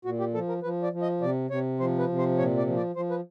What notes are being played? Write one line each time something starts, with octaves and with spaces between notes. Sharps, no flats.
A#2 F#4
G4
F3 A4
A#4
F3 B4
D5
F3
D#5
C3 D5
C3 C#5
F3 C5
B4
C3
C5
A#2 C#5
D5
F3
D5
F3 C5
B4